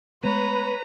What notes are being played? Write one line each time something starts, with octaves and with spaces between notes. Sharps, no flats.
G#3 A3 B3 B4 C#5 A#5 B5